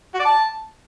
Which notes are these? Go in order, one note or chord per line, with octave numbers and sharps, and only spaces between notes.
F#4
D5
A5